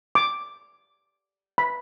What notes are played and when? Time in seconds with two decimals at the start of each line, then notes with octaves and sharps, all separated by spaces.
0.15 D6
1.58 B5